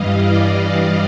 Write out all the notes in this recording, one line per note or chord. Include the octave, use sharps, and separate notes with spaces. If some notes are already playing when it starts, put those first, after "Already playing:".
Already playing: G2 E3 G3 D#5 F5
D5